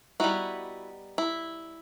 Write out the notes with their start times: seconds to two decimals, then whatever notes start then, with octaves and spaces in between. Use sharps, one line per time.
0.20 G3 B3 D#4 E4 F#4
1.18 E4